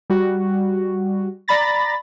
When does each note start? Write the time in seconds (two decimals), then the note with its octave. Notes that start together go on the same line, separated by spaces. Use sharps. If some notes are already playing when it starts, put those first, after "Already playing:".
0.10 G3 F#4
1.48 D5 A#5 B5 A6 A#6